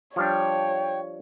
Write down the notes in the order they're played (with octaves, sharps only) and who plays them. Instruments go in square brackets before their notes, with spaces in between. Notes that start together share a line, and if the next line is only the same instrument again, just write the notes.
[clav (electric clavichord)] F3 G3 D4 [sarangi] C#5 [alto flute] G5